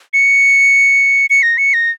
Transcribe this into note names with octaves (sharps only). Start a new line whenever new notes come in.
C#7
C#7
A#6
C#7
A#6